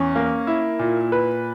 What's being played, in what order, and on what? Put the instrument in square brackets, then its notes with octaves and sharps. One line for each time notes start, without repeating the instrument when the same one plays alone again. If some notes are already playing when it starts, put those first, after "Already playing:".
Already playing: [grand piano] E2 C#4
A#3
E4
A#2
B4